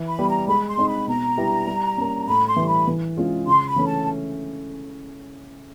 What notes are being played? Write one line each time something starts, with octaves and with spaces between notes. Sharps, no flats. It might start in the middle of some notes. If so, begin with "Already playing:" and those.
Already playing: E3
B5
G3 B3
A#5
G#3 B5
C6
C4 D#4 G#4
B5
B2 A#5
G3 B3 E4 G4
G3
A#3 C#4
A2 B5
C6
E3 G3
B5
E3
G#3 C#4 F4 G#4
C#3 C6
B5
E3 A3 C#4
A5